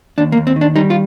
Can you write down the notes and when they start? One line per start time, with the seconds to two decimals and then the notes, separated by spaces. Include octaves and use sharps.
0.18 D#2 D4
0.32 A#3
0.37 D#2
0.47 C4
0.56 D#3
0.61 D4
0.75 G3 D#4
0.90 F4